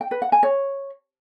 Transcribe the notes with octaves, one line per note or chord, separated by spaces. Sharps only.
G5
B4
F#5
G#5
C#5